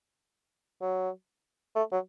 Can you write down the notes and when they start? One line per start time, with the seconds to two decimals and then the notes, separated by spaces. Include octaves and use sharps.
0.81 F#3
1.76 A3
1.92 F#3